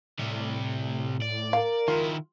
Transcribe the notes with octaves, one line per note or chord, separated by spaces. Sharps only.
A2 C3 G3
D5
A#4 F5
D#3 E4 F4